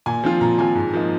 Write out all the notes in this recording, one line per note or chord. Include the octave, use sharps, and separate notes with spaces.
A#2 G#5
F3 C4 F4
A#2 A#5
F3 C4 F4 G#5
G#2
F3 A#3 D#4